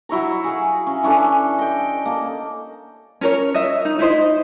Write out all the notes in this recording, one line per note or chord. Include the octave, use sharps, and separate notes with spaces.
F#3 E4 C#5 A#5
G#4 F5
C#4
E3 C#4 D4 A4
D#5 G5
A#3 A5
C#4 A#4 C#5
D#5 E5
D#4
D#4 E4 C5 D#5